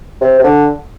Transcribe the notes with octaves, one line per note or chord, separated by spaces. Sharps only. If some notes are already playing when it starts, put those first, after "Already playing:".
C3
C3
D3